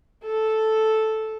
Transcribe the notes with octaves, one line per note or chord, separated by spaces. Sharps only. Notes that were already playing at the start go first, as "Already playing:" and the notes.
A4